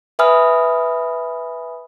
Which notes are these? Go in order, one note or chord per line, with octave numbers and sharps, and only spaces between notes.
B4 E5 G#5 B5 D#6 F6